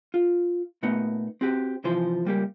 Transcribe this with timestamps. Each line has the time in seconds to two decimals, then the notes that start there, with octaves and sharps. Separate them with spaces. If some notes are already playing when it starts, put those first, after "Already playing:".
0.14 F4
0.83 A#2 A3 B3 D#4
1.41 C4 F#4 G4
1.84 C3 E3 F3 C5
2.25 C#2 G3 A#3 G4